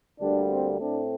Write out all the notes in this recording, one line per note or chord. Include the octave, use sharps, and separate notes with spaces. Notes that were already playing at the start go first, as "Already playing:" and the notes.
D2 D3 G3 A#3 D4
C4
A2 A3 C4 D4